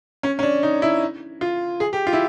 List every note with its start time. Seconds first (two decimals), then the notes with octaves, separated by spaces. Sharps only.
0.23 C#4
0.39 C#4
0.43 D4
0.63 D#4
0.82 E4
1.41 F4
1.80 G#4
1.93 G4
2.07 F4
2.13 E4